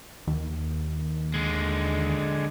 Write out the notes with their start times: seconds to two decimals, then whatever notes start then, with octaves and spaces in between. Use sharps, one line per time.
0.28 D#2
1.34 D3 G#3